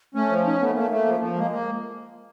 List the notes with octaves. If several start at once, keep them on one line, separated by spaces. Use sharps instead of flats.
A3 C#4
F3
C#4 D#4
A3 B3
A3 A#3
A3
F3
F3
G#3 A#3
A#3